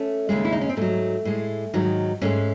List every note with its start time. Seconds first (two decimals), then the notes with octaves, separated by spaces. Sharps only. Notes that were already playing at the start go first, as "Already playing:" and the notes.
Already playing: A3 C#4
0.29 D#2 C#3 G#3
0.45 E4
0.52 D#4
0.61 C#4
0.69 C4
0.77 G#2 F#3 A3
1.25 A2 G#3
1.74 G#2 D#3 F#3
2.21 G#2 E3 G#3 A3 C#4